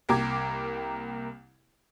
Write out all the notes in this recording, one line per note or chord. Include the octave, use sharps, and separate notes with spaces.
C2 A#3 G4 A#4 D6 G#6